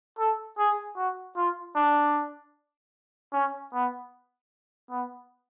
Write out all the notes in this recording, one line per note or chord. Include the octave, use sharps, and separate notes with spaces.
A4
G#4
F#4
F4
D4
C#4
B3
B3